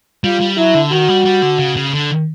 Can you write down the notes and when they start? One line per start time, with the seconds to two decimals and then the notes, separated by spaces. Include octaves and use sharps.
0.24 G3 F4
0.41 G3
0.58 F#3 E4
0.75 D3
0.91 D#3 F#4
1.09 G3
1.25 G3
1.42 D3
1.59 C#3
1.77 C#3
1.94 D3